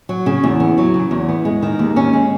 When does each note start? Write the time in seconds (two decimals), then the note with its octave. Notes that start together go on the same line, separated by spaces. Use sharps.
0.09 F#3
0.26 C#3
0.44 E2
0.60 B3
0.78 F#3
0.94 C#3
1.11 E2
1.29 B3
1.45 G#3
1.62 D#3
1.79 D#2
1.96 C#4
2.13 G#3